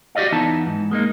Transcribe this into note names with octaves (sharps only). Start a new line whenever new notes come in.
F#4 G4 A4 D5 D#5 F5
E2 B3 D#4 E4 A5
G#2
G#3 A#3 D#4